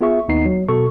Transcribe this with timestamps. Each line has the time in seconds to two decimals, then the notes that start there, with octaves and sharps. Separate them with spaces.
0.01 B3 F4 G#4 E5 C#6
0.28 D#2 B3 D#4 C7
0.46 F#3
0.69 B2 A4 C#6